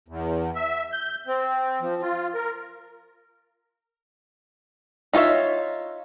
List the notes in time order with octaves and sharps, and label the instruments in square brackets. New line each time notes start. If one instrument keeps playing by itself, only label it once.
[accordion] E2
E5
G6
C4
F3
F4
A#4
[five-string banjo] D#4 F4 A4 C#5 E5